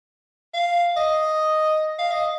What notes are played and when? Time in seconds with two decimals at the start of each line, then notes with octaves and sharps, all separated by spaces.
0.54 F5
0.97 D#5
1.99 F5
2.12 D#5